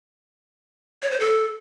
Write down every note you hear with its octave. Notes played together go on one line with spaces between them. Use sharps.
C#5
C5
A4